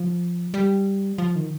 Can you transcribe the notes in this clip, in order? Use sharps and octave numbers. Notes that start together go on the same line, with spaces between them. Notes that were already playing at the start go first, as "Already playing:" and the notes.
Already playing: F3
G3
F3
D#3